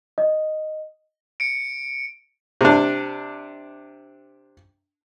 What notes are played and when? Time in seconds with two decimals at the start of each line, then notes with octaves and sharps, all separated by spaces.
0.18 D#5
1.40 C#7 D7
2.61 C3 D4